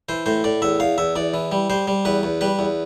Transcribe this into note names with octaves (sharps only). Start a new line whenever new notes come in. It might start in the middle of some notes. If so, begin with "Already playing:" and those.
E3 C5
A2 C5
A2 D5
E2 E5
E2 F5
E2 E5
E2 D5
E3
G3
G3 C5
G3
E2 B4
E2
G3 B4
E2